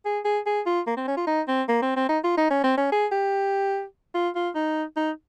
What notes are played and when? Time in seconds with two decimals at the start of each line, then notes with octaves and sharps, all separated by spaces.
0.05 G#4
0.25 G#4
0.46 G#4
0.66 F4
0.87 A#3
0.97 C4
1.08 C#4
1.17 F4
1.27 D#4
1.48 C4
1.68 A#3
1.82 C4
1.96 C4
2.09 D#4
2.24 F4
2.37 D#4
2.50 C#4
2.64 C4
2.77 C#4
2.92 G#4
3.11 G4
4.15 F4
4.35 F4
4.55 D#4
4.96 D#4